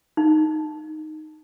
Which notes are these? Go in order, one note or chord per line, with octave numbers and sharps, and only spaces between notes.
D#4